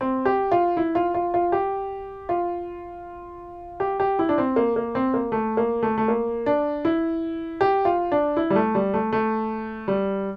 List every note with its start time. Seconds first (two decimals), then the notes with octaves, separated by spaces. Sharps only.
0.01 C4
0.25 G4
0.52 F4
0.77 E4
0.95 F4
1.14 F4
1.34 F4
1.52 G4
2.29 F4
3.80 G4
4.00 G4
4.19 E4
4.29 D4
4.38 C4
4.56 A#3
4.76 A#3
4.95 C4
5.14 A#3
5.32 A3
5.57 A#3
5.83 A3
5.98 A3
6.08 A#3
6.46 D4
6.85 E4
7.61 G4
7.85 F4
8.12 D4
8.37 E4
8.50 G3
8.56 A3
8.75 G3
8.94 A3
9.13 A3
9.88 G3